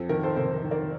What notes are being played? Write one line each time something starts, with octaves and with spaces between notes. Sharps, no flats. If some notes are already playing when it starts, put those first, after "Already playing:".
Already playing: F2 A4
D#3 A#4
A4 C5
C3 A4 C5
A#4
D#3
A#4 D5